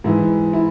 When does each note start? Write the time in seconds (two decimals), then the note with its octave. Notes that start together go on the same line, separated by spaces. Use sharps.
0.04 G#2 E3 E4
0.53 E4